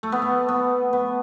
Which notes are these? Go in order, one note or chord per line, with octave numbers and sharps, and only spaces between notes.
A3
B3
A3
B3
B3